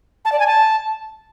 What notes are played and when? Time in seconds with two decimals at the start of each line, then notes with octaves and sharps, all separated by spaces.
0.25 A5
0.32 D5
0.39 G#5
0.47 A5